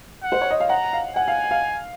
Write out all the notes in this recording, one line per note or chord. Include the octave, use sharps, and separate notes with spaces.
F#5
C5
C#5
D#5
F5
F#5 A#5
F5
F#5 G#5
F5
F5